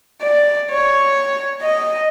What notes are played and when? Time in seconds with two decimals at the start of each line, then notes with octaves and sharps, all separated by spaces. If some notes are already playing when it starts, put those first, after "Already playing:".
0.22 D5
0.71 C#5
1.62 D#5